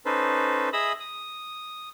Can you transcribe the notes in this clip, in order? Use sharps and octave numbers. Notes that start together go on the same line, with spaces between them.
C#4 D#4 A4 B4 C5
G#4 D#5 E5 B5 D#6 E6
D#6